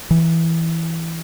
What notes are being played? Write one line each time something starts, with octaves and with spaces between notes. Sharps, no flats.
E3